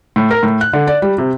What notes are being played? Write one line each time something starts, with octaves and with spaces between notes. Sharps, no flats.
A2
A#4
A2
F#6
D3
D5
G3
C3